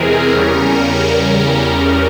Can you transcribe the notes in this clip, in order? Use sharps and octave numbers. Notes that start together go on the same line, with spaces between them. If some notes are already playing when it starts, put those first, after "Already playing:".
Already playing: E2 C3 E3 G#3 C4 G#4 A#4
E2 C#3 G3 C#4